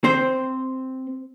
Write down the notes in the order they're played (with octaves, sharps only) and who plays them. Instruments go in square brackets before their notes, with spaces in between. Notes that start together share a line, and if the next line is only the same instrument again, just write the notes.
[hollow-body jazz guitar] C4 C5